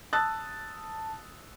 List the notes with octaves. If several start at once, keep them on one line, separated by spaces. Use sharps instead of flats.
A5 D#6 E6 F#6 A6